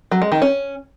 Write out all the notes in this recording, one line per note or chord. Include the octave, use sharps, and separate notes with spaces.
F#3
G#3
D#3
C#4